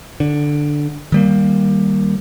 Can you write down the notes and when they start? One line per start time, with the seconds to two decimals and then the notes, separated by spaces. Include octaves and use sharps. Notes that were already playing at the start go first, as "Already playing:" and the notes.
0.20 D3
1.12 D#3 G3 A#3